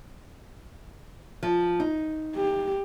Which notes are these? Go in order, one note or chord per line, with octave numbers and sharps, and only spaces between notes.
F3
D#4
G4